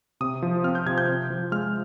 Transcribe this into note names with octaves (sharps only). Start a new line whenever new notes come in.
C3 D#6
F3
C4 F6
G6
C3 G#6
G6
C3
F3
G#3 F6